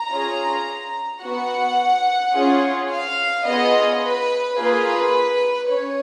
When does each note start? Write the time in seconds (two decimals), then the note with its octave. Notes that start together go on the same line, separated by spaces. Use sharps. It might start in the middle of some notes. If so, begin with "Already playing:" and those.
Already playing: A#5
0.10 C#4 F4 G#4
1.23 B3 F#4 F#5
2.34 C#4 F4 G#4
2.91 F5
3.46 B3 F4 G#4 D#5
4.03 B4
4.58 A#3 F4 G#4 B4
5.70 C#4 C#5